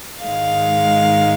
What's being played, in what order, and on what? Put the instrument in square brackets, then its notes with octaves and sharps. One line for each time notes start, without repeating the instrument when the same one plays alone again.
[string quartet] G#2 D#3 G#3 F5